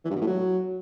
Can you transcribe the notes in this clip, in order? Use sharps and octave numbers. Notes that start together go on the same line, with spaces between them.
E3
G2
B2
A2
F#3